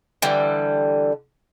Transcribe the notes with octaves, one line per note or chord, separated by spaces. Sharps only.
D3 E3 G3